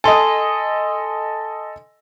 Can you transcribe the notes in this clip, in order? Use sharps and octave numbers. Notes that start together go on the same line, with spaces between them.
A4 D#5 G#5 C6